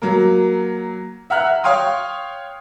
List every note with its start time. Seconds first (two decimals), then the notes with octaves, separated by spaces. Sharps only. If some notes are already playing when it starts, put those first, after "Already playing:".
0.02 F#3 A#3 A#4
1.30 E5 F#5 A#5 F6 F#6
1.64 C#5 F5 G5 C6 D#6